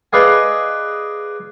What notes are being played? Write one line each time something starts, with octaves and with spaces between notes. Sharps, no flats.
G#4 B4 D5 D#5 F5 G#5